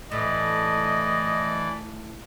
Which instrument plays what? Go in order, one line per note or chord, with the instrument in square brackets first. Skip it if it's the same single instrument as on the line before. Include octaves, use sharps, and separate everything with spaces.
[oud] A2 [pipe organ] E3 D5 [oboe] D#5